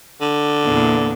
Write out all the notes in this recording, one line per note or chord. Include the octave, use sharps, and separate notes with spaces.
D3
E2 A#2